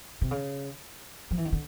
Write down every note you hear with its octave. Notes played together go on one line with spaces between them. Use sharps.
C3
C#3
F3
E3
D#3
D3